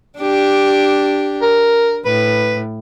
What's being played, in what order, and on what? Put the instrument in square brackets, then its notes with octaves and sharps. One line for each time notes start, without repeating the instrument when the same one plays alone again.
[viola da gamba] D4 G4
[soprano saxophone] A#4
[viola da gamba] A2 [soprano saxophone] B4